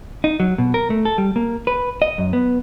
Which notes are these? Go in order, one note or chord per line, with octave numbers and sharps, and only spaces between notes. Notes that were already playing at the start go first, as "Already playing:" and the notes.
D#4
F#3
B2
A#4
A3
A4
G3
A#3
B4
D#5
F#2
B3